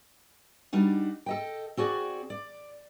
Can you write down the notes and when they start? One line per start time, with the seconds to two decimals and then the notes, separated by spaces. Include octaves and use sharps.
0.73 G3 D4 D#4 F#4
1.26 A4 D#5 G5
1.77 C4 F#4 G#4 D5
2.30 D5